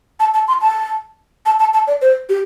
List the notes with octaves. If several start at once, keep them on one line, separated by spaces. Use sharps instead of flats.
A5
A5
C6
A5
A5
A5
A5
D5
C5
G4